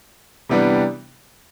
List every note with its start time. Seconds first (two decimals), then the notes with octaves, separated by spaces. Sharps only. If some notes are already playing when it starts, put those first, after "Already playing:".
0.49 C3 E3 G3 B3 D4